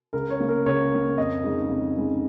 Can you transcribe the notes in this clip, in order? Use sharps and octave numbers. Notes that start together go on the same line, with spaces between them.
C#2 A#4
C#5
C#3 A#3
A#4
C#2 C#5
C#3 A#3
F2 D#5
C#3 G#3 D#4
F2
C#3 G#3 D#4